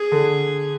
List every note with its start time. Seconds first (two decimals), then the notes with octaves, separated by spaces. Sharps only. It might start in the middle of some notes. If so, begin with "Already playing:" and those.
Already playing: G#4
0.12 D3